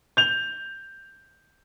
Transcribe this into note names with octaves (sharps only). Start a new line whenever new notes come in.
G6 F7